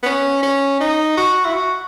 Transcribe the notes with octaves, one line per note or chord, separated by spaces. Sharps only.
B3
C#4
C#4
D#4
F#4
E4
F#4